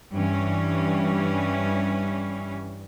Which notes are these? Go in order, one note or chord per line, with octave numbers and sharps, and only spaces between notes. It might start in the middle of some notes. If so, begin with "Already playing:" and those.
G2 E3 C#4